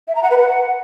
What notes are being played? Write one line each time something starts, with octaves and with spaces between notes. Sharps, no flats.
E5
A#5
F#5
B4
F#5